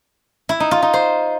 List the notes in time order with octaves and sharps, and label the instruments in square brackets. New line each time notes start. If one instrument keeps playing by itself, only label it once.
[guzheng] E4
D#4
F4
D#4
C5